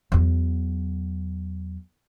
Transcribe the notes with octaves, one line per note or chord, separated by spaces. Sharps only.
E2 F#3